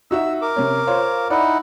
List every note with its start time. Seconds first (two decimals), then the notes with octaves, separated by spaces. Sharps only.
0.11 D#4 F#4 E5 E6
0.42 A#4 D6
0.56 C3 C#4
0.87 F4 C5 C#5
1.30 D#4 E4 D5 F#5